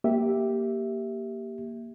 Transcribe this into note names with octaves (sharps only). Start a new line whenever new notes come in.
A#3 G4 E5